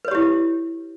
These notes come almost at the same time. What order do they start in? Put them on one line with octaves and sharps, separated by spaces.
B4 C#5 G4 E4